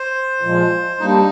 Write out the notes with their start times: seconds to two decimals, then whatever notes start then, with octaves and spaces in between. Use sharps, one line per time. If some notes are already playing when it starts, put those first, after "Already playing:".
Already playing: C5
0.42 A#2 F3 G#3
1.00 G3 A#3 D4 D#4